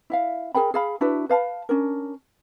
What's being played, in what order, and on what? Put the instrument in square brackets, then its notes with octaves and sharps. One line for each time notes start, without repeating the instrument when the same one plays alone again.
[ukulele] E4 E5 F5
G#4 A#4 G5 B5
G#4 F5 B5
D4 E4 F#4 B4
B4 F5 A5 B5
C#4 D4 A#4